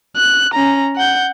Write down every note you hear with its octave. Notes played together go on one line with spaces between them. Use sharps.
F#6
C#4 A#5
F#5 G6